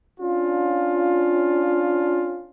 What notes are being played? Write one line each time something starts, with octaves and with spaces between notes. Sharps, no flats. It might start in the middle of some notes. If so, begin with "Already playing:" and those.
C#4 D4 F4